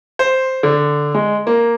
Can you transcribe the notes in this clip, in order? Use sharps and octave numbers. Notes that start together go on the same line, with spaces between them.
C5
D3
G#3
A#3